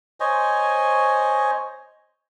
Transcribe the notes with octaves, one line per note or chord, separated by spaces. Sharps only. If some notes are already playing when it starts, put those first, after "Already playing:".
C5 C#5 D#5 G#5